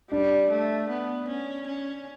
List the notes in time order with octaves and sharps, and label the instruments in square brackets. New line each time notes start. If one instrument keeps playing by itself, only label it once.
[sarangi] G3 [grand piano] D4
[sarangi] A3
B3
C#4
C#4